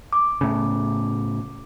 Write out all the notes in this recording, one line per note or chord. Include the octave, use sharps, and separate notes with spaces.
D6
A2 C#3